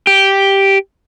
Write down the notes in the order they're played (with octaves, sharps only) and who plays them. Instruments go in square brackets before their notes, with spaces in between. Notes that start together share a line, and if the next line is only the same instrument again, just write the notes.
[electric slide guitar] G4